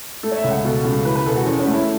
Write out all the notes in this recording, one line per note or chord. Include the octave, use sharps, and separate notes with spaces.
A3 A4
C#5
E5
C#2
F#5
B2 A4
C#2
E3 B4
B4
E1 A4
F#4
E2 C#4
C#4
A3
E4